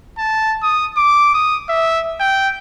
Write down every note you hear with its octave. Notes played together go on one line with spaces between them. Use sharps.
A5
D#6
D6
D#6
E5
G5